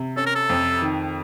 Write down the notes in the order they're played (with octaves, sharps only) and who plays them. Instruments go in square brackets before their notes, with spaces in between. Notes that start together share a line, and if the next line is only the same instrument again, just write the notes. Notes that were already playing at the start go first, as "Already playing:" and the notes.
Already playing: [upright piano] C3
[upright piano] C#4 [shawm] A4
[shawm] A#4
A4
[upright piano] F2
D#3